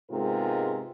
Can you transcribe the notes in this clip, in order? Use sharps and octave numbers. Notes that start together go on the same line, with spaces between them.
G#2 C3 G#3 B3 F4 A#4